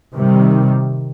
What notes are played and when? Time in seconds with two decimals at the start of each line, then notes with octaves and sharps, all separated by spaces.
0.13 C3 D#3 G3